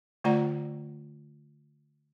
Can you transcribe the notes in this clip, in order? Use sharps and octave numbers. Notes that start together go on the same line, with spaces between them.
D3 A3 F4 D5 F#5 A#5